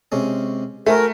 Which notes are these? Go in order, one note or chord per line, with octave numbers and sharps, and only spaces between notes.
C3 G#3 C#4
A3 F#4 A#4 C5 G#5